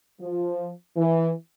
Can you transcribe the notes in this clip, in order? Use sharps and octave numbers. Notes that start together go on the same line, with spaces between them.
F3
E3